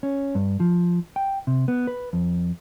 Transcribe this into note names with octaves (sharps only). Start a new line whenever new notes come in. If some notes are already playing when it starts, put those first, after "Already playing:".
C#4
G2
F3
G5
C3
B3
B4
F2